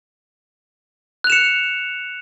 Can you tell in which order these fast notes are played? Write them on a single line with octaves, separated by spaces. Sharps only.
F#6 F7 E7 C#7